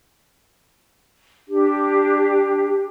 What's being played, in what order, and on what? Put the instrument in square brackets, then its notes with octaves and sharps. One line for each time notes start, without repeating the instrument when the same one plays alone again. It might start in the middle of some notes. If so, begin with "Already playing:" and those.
[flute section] D4 G4